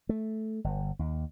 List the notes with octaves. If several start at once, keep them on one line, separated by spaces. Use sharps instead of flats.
A3
G1
D#2